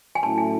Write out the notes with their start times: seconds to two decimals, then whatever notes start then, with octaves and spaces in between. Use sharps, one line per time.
0.15 G#5
0.22 A2 F#3 A3 C#4 E4 A5
0.38 G#5